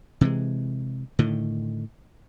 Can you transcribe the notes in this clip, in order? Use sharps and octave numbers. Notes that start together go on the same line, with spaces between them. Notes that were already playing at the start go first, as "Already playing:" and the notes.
C3 E3 G#3
A2 D3 D#3